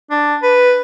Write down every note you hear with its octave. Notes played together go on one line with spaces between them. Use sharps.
D4
B4